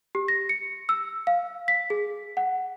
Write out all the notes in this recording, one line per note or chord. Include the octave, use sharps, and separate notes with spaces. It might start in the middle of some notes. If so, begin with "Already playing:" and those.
G4
A#6
C#7
E6
F5
B6
G#4
F#5